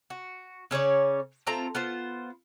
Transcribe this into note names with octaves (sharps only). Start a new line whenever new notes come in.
F#4
C#3 C#4 C#5 D5
A3 C4 F4 A#5
B3 F4 C5